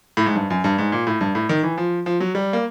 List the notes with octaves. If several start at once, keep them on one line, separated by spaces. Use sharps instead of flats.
A2
G#2
G2
F#2
G2
G#2
A#2
A2
G2
A2
D#3
E3
F3
F3
F#3
G3
A#3